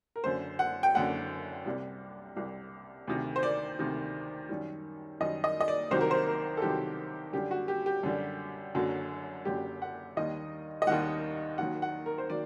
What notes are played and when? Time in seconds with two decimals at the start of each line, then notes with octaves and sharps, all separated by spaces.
0.16 A#4
0.24 F#1 F#2 D3 C5
0.59 F#5
0.83 G5
0.95 F#1 F#2 D3 F#5
1.66 C2 C3 G3
2.36 C2 C3 G3
3.07 D2 C3 D#3
3.36 C5
3.43 D5
3.79 D2 C3 D#3
4.49 F#2 D#3 G3
5.20 F#2 D#3 G3 D#5
5.44 D#5
5.60 D#5
5.68 D5
5.91 C2 C3 D#3 F#3 C5
6.01 A#4
6.11 C5
6.27 A#4
6.57 A4
6.62 C2 C3 D#3 F#3 G4
7.33 F#2 D3 G3 G4
7.51 F#4
7.68 G4
7.86 G4
8.03 F#2 D3 G3
8.74 F#1 F#2 D3 F#3
9.45 F#1 F#2 D3 F#3 G4
9.82 F#5
10.17 D#2 D#3 G3 D#5
10.82 D#5
10.87 D#2 D#3 G3 F#5
11.58 D#2 D#3 F#3 F#5
11.82 F#5
12.06 A#4
12.18 C5
12.30 D#3 F#3 D5